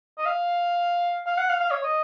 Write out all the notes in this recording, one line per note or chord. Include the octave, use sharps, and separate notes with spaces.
D#5
F5
F5
F#5
F5
F5
C#5
D#5